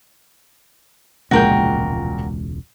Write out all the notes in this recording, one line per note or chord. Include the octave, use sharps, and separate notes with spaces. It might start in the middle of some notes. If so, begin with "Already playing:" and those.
E1 C#2 A#2 F3 G#3 F#4 A#4 G5